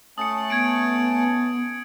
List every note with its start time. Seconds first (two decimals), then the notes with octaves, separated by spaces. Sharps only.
0.18 A3 C#4 A5 D#6 C#7
0.50 B3 G#6 C#7 D7